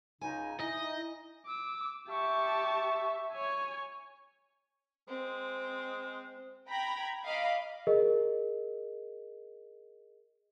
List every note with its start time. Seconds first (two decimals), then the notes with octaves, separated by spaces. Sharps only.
0.21 C#2 C#3 D#4 G#5
0.59 D#4 E4 D#5
1.47 D6 E6
2.09 G4 E5 A5 C#6
3.32 C#5 G#5
5.08 G#3 C4
6.68 G5 A#5 B5 G#6
7.24 D#5 F5 B5 D6
7.87 G#4 A#4 D#5